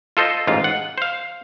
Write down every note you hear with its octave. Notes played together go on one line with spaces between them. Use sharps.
F4 A4 C5 D#5
A1 G#2 F4 F5
F#5
C5 F5